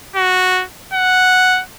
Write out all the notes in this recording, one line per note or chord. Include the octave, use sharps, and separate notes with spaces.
F#4
F#5